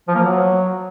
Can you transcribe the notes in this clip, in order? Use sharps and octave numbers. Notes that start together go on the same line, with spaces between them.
F3
A#3
F#3